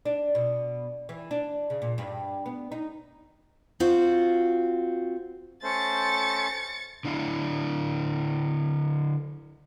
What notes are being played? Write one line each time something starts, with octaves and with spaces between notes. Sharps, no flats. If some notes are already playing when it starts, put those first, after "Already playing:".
D4
B2
E3
D4
C#3
A#2
G2
B3
D#4
C4 F4 F#4
A3 C#4 C5 A6 C#7
D3 D4 E4 F5